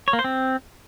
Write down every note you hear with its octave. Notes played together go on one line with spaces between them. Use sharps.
C#5
A#3
C5
C4